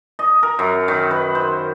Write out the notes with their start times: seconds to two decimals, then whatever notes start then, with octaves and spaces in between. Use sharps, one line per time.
0.19 D#5
0.43 A#4
0.59 F#2
0.88 D#3
1.11 B4
1.35 C5